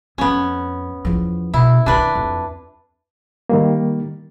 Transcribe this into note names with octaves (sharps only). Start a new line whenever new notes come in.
F2 B3 C#4
E2 F3
B2 E4
D#3 D4 D#4 B4
F2
D#3 G3 A#3